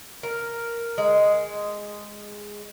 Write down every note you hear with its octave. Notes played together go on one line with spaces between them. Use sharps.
A#4
G#3